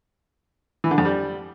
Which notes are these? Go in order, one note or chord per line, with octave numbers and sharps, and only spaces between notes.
E3
D3
F2
G3